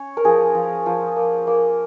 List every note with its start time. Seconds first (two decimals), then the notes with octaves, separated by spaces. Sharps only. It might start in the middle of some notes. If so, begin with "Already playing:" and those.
Already playing: C#4 C#5
0.17 A#4
0.25 F3 G#4
0.55 F3
0.86 F3
1.16 A#3
1.47 A#3